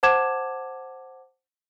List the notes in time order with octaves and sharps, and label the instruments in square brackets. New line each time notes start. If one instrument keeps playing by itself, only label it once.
[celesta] C5 F#5 A5 D6 G#6 E7